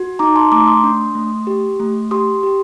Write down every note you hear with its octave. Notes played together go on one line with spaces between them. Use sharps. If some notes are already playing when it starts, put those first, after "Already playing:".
Already playing: F#4
D#4 A#5 D6
A5 C6
A3 A#5 D6
C6 D#6
D4
A3
G4
A3
G4 C6 D#6
G4